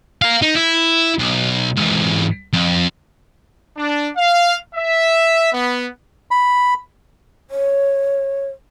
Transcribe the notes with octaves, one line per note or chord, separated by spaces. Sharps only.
A#4 F5
D#4
E4
B1
G#2 E3
F2
D4
F5
E5
B3
B5
C#5